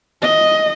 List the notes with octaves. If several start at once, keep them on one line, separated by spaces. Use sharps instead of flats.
D#5